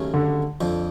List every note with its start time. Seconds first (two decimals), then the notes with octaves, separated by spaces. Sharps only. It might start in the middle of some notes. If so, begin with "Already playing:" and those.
Already playing: D#2 C#3 F#3 A3 C#4
0.14 D3
0.61 F2 D3 F3